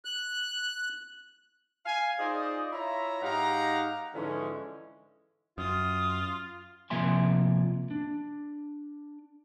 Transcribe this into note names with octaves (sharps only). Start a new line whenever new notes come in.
F#6
F5 G#5
D#4 F4 G#4 C5 D5 D#5
E4 F4 C#5 E5 A#5
G#2 D#4 G4 F5 F#5 A#5
G#2 D3 E3 F3 G#3 C#4
F#2 F4 D#6
C3 F3 A#3 E5 G#5 C6
D4